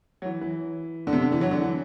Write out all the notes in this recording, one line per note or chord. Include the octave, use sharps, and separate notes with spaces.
F#3
E3
E3
D3
C3
D3
E3
F#3
D3
E3